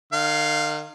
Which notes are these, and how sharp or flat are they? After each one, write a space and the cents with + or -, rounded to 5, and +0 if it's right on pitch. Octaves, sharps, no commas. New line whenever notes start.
D#3 -40 F5 +0